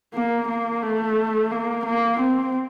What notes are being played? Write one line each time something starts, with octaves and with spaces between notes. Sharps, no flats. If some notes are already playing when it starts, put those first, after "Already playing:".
A#3
A#3
A3
A#3
A#3
C4